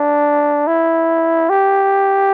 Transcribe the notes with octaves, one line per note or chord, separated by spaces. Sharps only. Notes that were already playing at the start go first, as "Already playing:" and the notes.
Already playing: D4
E4
G4